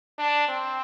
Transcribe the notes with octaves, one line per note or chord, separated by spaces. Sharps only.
D4
C4